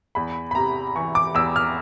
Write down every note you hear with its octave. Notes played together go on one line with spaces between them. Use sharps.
E2 B5
B5
C3 A#5
E3 C#6
D6
E2 E6
F6